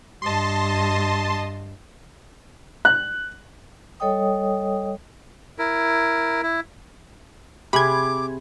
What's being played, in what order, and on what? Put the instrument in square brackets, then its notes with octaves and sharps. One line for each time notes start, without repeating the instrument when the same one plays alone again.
[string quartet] G2 D#5 [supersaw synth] A5 C6
[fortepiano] F#6
[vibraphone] G3 A4 C#5 D#5 G5 D#6
[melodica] E4 A#4
E4
[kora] C3 G#4 [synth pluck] B5 G#6 [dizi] D6